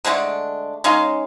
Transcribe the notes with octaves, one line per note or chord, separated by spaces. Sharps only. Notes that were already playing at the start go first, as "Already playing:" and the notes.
D3 G#3 A3 D4
G#3 C#4 D#4 F5